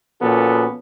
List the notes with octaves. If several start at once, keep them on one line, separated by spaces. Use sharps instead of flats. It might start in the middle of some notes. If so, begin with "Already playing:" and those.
A#2 F3 B3 C#4 F#4 A4